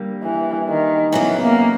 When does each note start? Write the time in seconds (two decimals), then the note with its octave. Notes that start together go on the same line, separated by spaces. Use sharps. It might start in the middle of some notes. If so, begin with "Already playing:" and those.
Already playing: D3 G3 A#3
0.24 E3
0.69 D#3
1.12 C#3 E3 F#3 B3
1.42 A#3